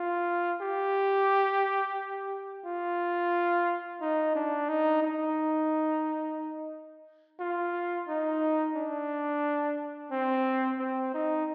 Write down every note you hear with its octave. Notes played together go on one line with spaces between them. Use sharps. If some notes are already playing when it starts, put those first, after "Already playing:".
Already playing: F4
G4
F4
D#4
D4
D#4
D#4
F4
D#4
D4
C4
C4
D#4